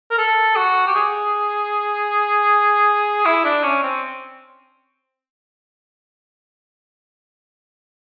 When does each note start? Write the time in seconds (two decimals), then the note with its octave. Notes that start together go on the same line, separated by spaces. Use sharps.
0.11 A#4
0.18 A4
0.56 F#4
0.87 G4
0.95 G#4
3.25 E4
3.44 D4
3.64 C#4
3.83 C4